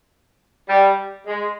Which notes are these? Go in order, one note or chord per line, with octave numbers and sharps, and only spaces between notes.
G3
G#3